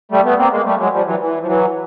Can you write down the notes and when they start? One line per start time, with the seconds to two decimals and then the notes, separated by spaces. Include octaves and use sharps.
0.11 G3 A3
0.25 A3 B3
0.38 A#3 C4
0.52 G#3 A#3
0.65 G3 A3
0.79 F#3 G#3
0.92 F3 G3
1.06 E3 F#3
1.20 E3
1.41 F3
1.47 E3 F#3